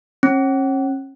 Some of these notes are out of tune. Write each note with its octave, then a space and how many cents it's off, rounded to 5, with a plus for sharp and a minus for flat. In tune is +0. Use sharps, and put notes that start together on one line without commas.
C#4 -35